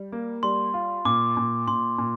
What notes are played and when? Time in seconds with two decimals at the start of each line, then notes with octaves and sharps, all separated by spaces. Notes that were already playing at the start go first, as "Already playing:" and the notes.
Already playing: G3
0.12 A#3
0.43 G3 C6
0.74 F4
1.05 A#2 D6
1.37 A#2
1.67 A#2 C6
1.98 A#2